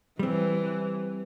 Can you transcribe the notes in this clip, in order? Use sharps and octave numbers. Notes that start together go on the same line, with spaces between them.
E3 G3 C4